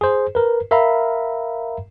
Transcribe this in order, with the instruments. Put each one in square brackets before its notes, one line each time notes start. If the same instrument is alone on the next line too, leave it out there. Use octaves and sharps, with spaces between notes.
[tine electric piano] G#4 C5
A#4 B4
A#4 E5 F5 A#5 B5